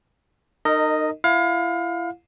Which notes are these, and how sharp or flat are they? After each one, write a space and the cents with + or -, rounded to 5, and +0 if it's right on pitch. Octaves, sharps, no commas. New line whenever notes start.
D#4 -25 A#4 -30 D#5 +0
E4 +35 F5 +30